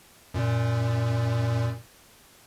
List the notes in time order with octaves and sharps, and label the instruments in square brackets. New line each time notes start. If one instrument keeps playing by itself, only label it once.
[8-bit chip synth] F#2 A#2